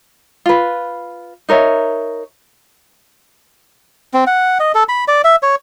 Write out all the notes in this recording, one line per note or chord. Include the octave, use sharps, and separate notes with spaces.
F4 B4
D#4 A#4 C#5 E5
C4
F#5
D#5
A4
B5
D5
E5
C#5